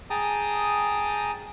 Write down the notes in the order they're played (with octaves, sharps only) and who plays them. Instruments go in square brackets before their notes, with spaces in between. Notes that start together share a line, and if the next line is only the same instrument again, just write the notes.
[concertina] G#4 G5 A5 A#5 D#6